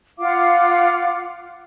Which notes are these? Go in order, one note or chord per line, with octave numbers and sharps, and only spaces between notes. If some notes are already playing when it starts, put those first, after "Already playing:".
F4 F5 F#5 D6